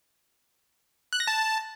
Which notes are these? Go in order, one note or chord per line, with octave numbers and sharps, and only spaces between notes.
F#6
A#6
A5